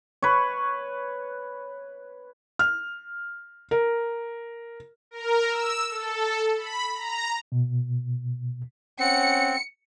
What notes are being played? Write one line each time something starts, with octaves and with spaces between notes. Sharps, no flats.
B4 C#5
F6
A#4
A#4
E6
A4
B5
A#5
B2
C4 C#4 F#5 C#7